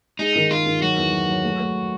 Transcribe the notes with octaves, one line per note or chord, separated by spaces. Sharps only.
G#3 D#4
D#3
G#3 F4
D#3
F#3 F#4
E2
F#3
F#3
A3
A3